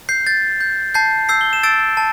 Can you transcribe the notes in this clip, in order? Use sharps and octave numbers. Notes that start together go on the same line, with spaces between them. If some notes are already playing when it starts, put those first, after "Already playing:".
G6 C7
G6 A6
G6
A5 G6 C7
E6 G6 C7
G7
E7
E6 A6 D7
A5